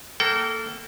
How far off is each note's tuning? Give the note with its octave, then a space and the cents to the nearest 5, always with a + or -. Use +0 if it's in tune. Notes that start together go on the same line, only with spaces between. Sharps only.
A#3 -20 A4 +0 G5 -40